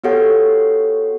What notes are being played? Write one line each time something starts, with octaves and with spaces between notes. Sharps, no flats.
B3 F#4 G4 A4 C#5 F#5